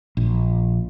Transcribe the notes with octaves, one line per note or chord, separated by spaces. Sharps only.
A#1